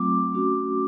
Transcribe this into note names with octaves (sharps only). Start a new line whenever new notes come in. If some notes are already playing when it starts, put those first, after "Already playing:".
Already playing: F#3 A3 C4 F4 D6
A3 C#4 F#4